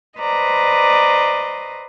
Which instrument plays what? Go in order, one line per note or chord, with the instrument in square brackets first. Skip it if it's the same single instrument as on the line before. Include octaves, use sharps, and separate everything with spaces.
[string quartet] B4 C5 D5 D#5 A#5